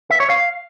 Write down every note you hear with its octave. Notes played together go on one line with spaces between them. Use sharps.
E5
C#5
F5